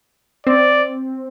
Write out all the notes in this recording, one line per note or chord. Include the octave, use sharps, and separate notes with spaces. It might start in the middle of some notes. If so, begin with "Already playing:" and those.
C4 D5